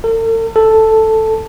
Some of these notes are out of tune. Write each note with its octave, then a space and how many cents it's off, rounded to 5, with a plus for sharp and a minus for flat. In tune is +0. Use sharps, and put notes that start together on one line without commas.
A4 +45
A4 +0